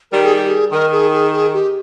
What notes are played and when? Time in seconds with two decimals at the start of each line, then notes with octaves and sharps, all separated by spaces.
0.11 D#3 G3 A#4
0.23 G#4
0.35 G4
0.48 G#4
0.72 D#3 A#4
0.92 G#4
1.13 G#4
1.32 G#4
1.54 G4